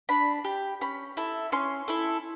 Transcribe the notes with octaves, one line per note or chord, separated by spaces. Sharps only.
D4 B5
G4
C#4 B5
E4 A4
C#4 C6
E4 A4